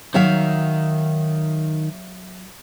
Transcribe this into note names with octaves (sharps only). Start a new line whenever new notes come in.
D#3 F#3 E5 F5